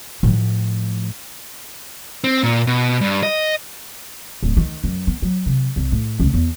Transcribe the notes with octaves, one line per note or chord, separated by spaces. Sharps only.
A2 F3
C4
A#2
B2
G2
D#5
D1
D#3
F#2
B3
F#3
C3
C2
A2
C#2
E2